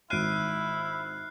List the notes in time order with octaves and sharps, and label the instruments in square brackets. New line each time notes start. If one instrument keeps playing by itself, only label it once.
[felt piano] G#1 D7 D#7 [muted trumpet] E4 [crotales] F6 F#6 C7